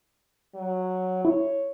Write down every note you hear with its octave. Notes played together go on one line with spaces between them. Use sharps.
F#3
E4 C#5